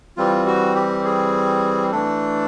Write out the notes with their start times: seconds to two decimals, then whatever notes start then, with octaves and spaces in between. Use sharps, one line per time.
0.17 E3 G3 C4 F4
0.47 F#4
0.75 G4
1.05 G#4
1.92 E3 A3 D4 A4